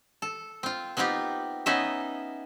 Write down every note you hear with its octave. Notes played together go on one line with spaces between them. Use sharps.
A4
C4 F4
B3 C4 D#4 F4 G4
B3 C#4 D#4 D#5 E5